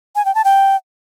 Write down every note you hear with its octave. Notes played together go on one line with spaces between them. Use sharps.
G#5
G5
A5
G5